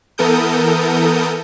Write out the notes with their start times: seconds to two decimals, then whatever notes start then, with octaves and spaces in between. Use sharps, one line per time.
0.18 E3 B3 A4 A#4 D#6 G6